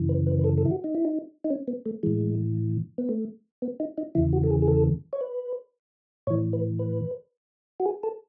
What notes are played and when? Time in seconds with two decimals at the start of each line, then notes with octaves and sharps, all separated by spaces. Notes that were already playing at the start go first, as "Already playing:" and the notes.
Already playing: F#2 C#3 E3
0.09 B4
0.26 B4
0.39 B4
0.44 A4
0.58 A4
0.65 E4
0.71 F#4
0.84 D#4
0.95 E4
1.05 D#4
1.44 D#4
1.50 C#4
1.68 B3
1.86 A3
2.03 A2 E3 G#3
2.98 B3
3.09 A3
3.62 B3
3.80 D#4
3.98 D#4
4.15 E2 C#3 E3 E4
4.33 F#4
4.44 A4
4.51 G#4
4.62 G#4
4.68 A4
5.13 C#5
5.21 B4
6.27 A2 E3 C#5
6.53 B4
6.79 B4
7.80 F#4
7.86 G#4
8.03 A4